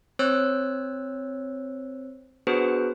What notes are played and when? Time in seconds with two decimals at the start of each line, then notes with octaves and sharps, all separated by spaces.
0.19 C4 C5 C#5 E6 F#6
2.47 B3 D4 F#4 G#4 B4 C5